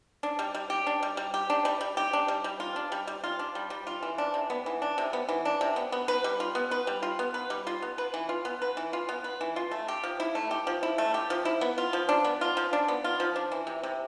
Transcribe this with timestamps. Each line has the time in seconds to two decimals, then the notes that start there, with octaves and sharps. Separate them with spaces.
0.23 D4
0.39 G3
0.55 G3
0.70 G4
0.87 D4
1.03 G3
1.17 G3
1.34 G4
1.50 D4
1.65 G3
1.81 G3
1.97 G4
2.13 D4
2.28 G3
2.44 G3
2.60 F4
2.76 D4
2.92 G3
3.07 G3
3.24 F4
3.39 D4
3.55 G3
3.70 G3
3.87 F4
4.03 E3
4.18 D4
4.34 C3
4.50 B3
4.66 E3
4.82 D4
4.98 C3
5.13 B3
5.29 E3
5.45 D4
5.61 C3
5.76 B3
5.92 B3
6.08 B4
6.24 G3
6.40 F4
6.55 B3
6.71 B4
6.87 G3
7.03 F4
7.19 B3
7.34 B4
7.50 G3
7.67 F4
7.82 B3
7.98 B4
8.14 E3
8.29 F4
8.45 B3
8.62 B4
8.77 E3
8.93 F4
9.09 B3
9.24 B4
9.41 E3
9.56 F4
9.71 A3
9.88 G4
10.04 F3
10.20 E4
10.35 A3
10.51 G4
10.67 F3
10.83 E4
10.98 A3
11.14 G4
11.30 F3
11.45 E4
11.61 B3
11.78 F4
11.93 F3
12.09 D4
12.24 B3
12.41 F4
12.57 F3
12.73 D4
12.88 B3
13.04 F4
13.20 F3
13.36 D4
13.52 E3
13.67 C3
13.83 C3